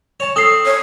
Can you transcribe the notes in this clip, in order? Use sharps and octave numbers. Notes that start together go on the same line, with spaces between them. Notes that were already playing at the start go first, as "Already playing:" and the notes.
C#5 A5
C4 A4 D#6 C7
C#5